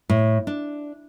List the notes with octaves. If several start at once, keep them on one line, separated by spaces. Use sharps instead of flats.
A2
D4